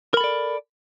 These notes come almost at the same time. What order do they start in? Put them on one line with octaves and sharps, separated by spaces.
A#4 B5 A4 D5